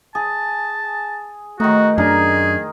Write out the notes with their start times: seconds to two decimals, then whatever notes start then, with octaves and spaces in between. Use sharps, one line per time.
0.15 G#4 A5
1.60 D#3 A3 D#4 F#4
1.98 F#2 D4 G#4 A#4